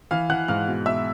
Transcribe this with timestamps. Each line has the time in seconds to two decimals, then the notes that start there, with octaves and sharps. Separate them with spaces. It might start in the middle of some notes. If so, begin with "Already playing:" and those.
0.11 E3 F5 F6
0.29 E3 F#5 F#6
0.48 G#2 F5 F6
0.67 B2
0.86 B2 E5 E6